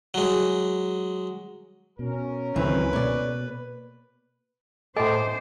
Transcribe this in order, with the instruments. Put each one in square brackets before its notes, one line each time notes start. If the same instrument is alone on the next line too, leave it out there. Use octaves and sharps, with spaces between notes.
[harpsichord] F#3 G#3
[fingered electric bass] B2 [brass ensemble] C#4 A#4
[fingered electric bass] C#2 F#3 [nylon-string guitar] D#3 E3 C4 [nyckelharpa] B4
[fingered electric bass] B2 A#3 [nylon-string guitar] C#5 D5
[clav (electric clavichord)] A2 E5 [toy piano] A4 D#5 G#5 [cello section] C5 [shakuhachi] D6